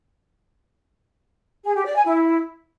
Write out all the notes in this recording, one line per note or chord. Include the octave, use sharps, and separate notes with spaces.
G#4
G4
D5
G#5
E4